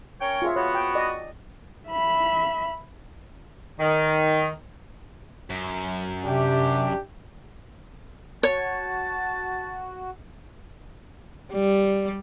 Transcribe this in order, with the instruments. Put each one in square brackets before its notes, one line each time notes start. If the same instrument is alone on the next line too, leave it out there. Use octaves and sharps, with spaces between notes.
[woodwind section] C#4 A#4 C#5 [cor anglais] G5
[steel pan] F4 G#4 E5
[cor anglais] B3 [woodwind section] F#4 [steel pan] C#5
[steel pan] G5
D5 D#5
[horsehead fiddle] E5 B5
[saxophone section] D#3
[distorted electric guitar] F#2
[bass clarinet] C3 [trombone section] D4 G4
[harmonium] F#4 [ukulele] C#5 [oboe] A5
[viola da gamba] G3